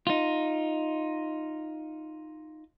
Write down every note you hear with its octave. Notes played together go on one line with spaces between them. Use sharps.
D#4 F4